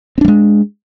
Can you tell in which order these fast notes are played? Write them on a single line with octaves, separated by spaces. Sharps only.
C4 D4 G3 G#3